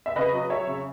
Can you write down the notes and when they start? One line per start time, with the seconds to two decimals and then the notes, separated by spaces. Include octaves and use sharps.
0.06 E5
0.16 C#3 B4 D#5
0.33 F#3
0.49 F#3 C#5 E5
0.67 C#3